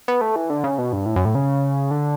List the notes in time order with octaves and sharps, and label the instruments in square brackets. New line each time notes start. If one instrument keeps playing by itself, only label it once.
[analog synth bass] B3
A3
E3
D3
C#3
B2
G2
A2
F#2
A2
C#3
D3